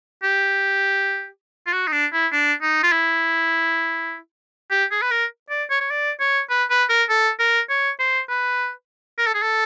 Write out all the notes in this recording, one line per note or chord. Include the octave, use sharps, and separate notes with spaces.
G4
F4
F#4
D#4
D4
E4
D4
D#4
F4
E4
G4
G#4
B4
A#4
D5
C#5
C#5
D5
C#5
B4
B4
A#4
A4
A#4
C#5
C5
B4
A#4
A4
G#4
A4